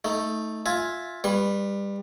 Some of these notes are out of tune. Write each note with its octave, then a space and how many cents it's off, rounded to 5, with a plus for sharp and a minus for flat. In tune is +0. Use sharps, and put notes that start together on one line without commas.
A3 +0 D#4 +20
F4 +10 E5 +0 G#5 +0
G3 +25 B4 +0 C6 +45